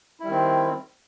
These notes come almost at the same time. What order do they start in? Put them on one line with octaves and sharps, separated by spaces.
E4 G3 D#3 C4